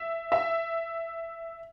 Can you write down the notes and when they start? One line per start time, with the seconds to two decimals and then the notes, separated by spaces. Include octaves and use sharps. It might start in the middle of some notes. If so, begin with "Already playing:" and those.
Already playing: E5
0.32 E5